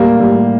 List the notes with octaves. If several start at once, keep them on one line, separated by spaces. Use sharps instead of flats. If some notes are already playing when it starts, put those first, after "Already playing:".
Already playing: A2 G3 A#3
A2 G3